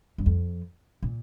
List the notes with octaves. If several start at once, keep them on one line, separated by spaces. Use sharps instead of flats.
G2
F2
A#2